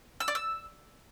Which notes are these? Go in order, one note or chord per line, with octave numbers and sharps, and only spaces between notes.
E6
D5
E6